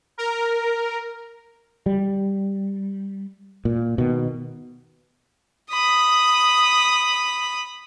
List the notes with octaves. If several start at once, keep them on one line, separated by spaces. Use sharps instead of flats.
A#4
G3
A#2
B2 D#3
B5 D#6